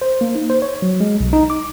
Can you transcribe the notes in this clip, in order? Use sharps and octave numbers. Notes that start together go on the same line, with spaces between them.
C5
A#3
D#4
C5
C#5
F#3
G#3
B1
D#4
D6